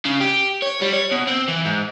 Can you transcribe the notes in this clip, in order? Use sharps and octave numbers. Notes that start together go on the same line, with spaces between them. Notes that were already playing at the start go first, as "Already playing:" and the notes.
C#3
G4
C#5
G3
C#5
B2
C4
E3
G#2